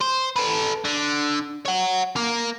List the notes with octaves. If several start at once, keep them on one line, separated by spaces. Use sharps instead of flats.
C5
A4 B4
D3
C#5 F#5
A#3